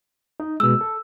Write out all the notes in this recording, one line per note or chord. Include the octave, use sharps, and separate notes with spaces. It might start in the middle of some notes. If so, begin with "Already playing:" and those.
D#4
B2 G#3 E6
A4